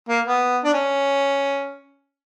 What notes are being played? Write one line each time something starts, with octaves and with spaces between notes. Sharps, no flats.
A#3
B3
D4
C#4